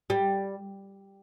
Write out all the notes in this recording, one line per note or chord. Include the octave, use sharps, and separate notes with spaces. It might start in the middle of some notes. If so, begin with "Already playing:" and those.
G3